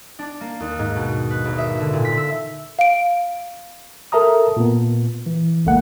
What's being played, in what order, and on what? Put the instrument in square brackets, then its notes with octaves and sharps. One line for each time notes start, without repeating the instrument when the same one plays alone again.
[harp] D4
A#3
D#2
G#2
B2
B4
G#1
E5
D3
A#2
B6
E6
[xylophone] F5 D7
[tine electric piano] A4 A#4 E5 A5 A#5 D#6
A#2 B3
E3
G#1 C#2 A3 A#3 F#5